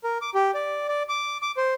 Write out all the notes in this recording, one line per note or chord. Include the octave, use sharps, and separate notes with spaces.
A#4
D6
G4
D5
D5
D6
D6
C5